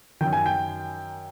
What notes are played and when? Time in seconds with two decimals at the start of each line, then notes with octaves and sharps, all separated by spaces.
0.21 F#2 D#3 G5
0.33 G#5
0.46 G5